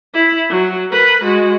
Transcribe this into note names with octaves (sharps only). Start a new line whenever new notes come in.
E4
F#3
A#4 B4
G#3 F#4